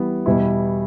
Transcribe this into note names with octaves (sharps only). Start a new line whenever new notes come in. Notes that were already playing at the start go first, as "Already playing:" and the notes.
Already playing: E3 G3 B3
E2 B2 G3 E4